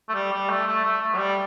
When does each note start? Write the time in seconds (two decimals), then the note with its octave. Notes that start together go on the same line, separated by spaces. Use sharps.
0.09 A3
0.14 G3
0.32 G3
0.49 A3
0.66 A3
0.84 A3
1.01 A3
1.14 F#3
1.18 G3